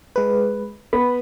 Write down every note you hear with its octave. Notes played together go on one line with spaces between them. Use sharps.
G#3 B4
B3 B5